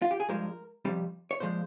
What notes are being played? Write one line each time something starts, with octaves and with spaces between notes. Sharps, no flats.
F4
G4
G#4
G2 F3 G#3 A#4
F2 C3 G3
C#5
A#2 F3 G#3 C5